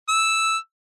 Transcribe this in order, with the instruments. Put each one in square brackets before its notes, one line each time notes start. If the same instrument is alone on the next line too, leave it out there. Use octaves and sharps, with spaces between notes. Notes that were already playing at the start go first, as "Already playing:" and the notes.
[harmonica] E6